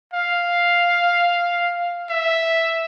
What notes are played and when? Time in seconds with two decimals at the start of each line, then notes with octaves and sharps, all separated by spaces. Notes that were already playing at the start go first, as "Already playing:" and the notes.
0.14 F5
2.10 E5